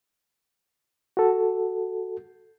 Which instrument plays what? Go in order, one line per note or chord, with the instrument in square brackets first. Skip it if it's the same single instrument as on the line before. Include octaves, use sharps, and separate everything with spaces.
[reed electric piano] F#4 A4